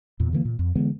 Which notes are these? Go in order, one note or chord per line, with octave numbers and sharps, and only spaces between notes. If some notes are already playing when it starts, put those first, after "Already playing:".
E2 A#2
D3 E3 A#3
A#2
F2
D3 E3 G#3 B3